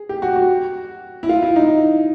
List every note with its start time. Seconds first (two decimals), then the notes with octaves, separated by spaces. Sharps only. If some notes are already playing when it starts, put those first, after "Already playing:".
Already playing: G#4
0.09 G4
0.22 F#4
0.36 F#4
1.23 E4
1.29 F4
1.42 E4
1.56 D#4